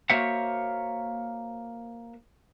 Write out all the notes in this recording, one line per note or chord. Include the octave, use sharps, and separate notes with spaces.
A#3 F#4 C5 C#5 E5 F#5